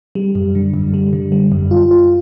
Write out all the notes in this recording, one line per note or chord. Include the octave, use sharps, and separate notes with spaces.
G3
F#2
D3
F#2
G3
D3
G3
F#2
F4
F4